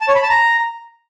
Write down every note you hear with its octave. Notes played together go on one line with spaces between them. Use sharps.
A5
C#5
B5
A5
A#5